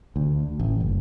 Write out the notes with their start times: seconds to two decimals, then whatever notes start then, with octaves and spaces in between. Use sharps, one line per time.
0.16 D2
0.60 A1
0.81 F#1